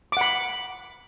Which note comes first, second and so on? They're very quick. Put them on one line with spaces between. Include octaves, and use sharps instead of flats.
D6 F#5 B5